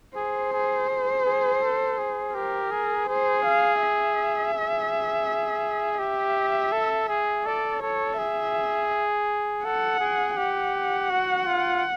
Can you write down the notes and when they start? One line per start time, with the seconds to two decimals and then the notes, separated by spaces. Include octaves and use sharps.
0.16 G#4 C5
0.53 G#4
0.89 G#4
1.26 G#4
1.62 A4
1.98 G#4
2.35 G4 A#4
2.71 G#4
3.08 G#4 C5
3.45 F5
3.82 E5
4.54 G#4
5.99 G4 E5
6.73 A4
7.09 G#4
7.45 A4 D5
7.83 A4 C#5
8.18 G#4 E5
9.65 A4 F#5
10.00 G#4
10.37 G4 F#5
11.10 F#4
11.47 F4